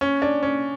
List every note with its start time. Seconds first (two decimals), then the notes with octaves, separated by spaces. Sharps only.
0.01 C#4
0.22 D4
0.43 C#4